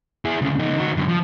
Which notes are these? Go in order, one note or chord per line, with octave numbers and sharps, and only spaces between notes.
E4 G#4
D2 C#3
C#2 D#4
D#3 F#4
F#2 D3
F3